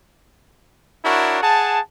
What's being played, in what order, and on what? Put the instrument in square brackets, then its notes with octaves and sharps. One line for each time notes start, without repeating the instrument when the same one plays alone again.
[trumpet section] D4 E4 F#4 A#4 C#5
G#4 F#5 A5